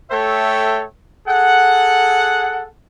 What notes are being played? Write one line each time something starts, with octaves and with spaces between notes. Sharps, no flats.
A3 A4 C#5 E5 G5
G#4 A4 F#5